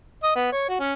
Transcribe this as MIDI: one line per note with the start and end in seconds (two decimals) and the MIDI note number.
0.23 0.32 75
0.36 0.49 59
0.52 0.67 73
0.69 0.77 66
0.80 0.94 61